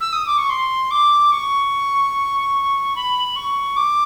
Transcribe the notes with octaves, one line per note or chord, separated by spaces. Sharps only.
E6
D#6
D6
C#6
C6
D6
C#6
B5
C#6
D6